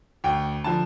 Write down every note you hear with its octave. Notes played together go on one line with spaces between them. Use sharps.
D2 G5
D3 F3 A5